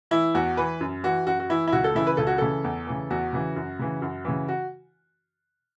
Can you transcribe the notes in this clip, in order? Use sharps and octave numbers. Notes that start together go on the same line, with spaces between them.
E3 E4
E2 F#4
E3 B4
F#2
E3 F#4
F#2 F#4
F#4
E3 E4
E4
C#2 F#4
A4
C#3 E3 E4
B4
C#2 A4
F#4
C#3 E3 A4
E2
C#3 E3
E2 F#4
C#3 E3
F#2
C#3 E3
F#2
C#3 E3
F#4